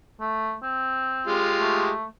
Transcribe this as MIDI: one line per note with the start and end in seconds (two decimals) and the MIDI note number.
0.21 0.55 57
0.63 1.32 60
1.27 1.91 56
1.27 1.91 65
1.27 1.91 67
1.60 2.05 57